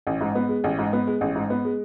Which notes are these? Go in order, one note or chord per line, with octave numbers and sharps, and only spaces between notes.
A1
G#2
B3
G#3
A1
G#2
B3
G#3
A1
G#2
B3
G#3